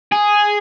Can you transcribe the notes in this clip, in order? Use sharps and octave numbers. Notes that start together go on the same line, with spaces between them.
G#4